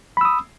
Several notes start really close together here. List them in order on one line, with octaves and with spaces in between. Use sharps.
B5 E6 D#6